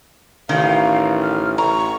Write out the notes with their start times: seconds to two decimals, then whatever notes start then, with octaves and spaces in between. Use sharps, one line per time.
0.49 A1 D#3 F5
1.22 F6
1.58 A1 A#5 C#6